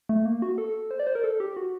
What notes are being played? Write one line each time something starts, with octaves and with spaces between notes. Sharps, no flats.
A3
A#3
F#4
A4
C5
D5
C5
A#4
A4
G4
F#4